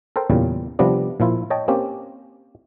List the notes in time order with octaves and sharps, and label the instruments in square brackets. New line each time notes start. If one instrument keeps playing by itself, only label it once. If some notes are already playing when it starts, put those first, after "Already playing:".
[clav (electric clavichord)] A4 A#4 C5 G5
E2 A#2 C#3 G3
C3 F3 G3 B3 D4
A#2 F3 E4 F4
C#5 D#5 G5 A5
A#3 C4 C#4 G4